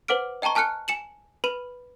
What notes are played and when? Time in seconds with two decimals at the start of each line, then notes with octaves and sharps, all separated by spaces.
0.08 B4 C5 F#5 D6 F6 D7
0.42 D#5 G5 A5 A#5 C#6
0.55 G#5 A5 F6 F#6 C#7
0.88 G#5 C#7 E7 F#7
1.44 B4 B5 D#7